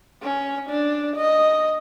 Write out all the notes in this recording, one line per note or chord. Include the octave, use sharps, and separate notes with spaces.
C#4
D4
D#5